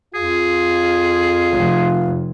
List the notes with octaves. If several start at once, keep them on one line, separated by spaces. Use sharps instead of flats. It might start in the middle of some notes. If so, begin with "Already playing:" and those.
F2 F4 G#4
F1